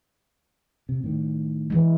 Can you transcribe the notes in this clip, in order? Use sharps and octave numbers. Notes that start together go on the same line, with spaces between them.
C3
A2 D#3
E3 G#3